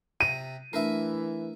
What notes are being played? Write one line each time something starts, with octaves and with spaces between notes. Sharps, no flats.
C3 A#5 D#7
E3 A3 D4 A#4 B4 E5